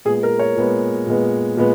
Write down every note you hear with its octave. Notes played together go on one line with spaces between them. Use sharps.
A#2 G#3 B3 G#4
A#4
C#5
A#2 G#3 B3
A#2 G#3 B3
A#2 G#3 B3